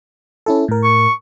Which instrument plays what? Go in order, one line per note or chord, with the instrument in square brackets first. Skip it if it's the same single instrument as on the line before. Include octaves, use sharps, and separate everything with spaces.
[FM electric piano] C#4 E4 A4
A2 A#4
[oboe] C#6